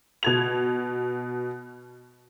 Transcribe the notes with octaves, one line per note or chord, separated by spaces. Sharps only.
B2 G#6 F7